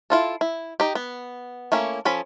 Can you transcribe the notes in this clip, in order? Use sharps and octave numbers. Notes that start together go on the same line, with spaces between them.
E4 F4 A4
E4
D#4 G4
B3
A3 A#3 C#4 E4
F3 C#4 A4 B5